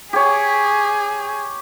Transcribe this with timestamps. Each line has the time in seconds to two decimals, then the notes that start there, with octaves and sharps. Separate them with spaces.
0.13 G4 G#4 C#5